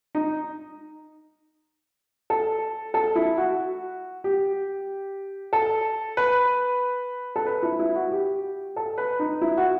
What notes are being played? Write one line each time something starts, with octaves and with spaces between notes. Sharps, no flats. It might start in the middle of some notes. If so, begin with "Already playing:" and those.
D#4
A4
A4
E4
F#4
G4
A4
B4
A4
B4
E4
E4
F#4
G4
A4
B4
D#4
E4
F#4